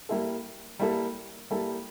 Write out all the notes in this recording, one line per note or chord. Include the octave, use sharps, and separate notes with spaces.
G3 A#3 E4 A4
G3 A#3 E4 A4
G3 A#3 E4 A4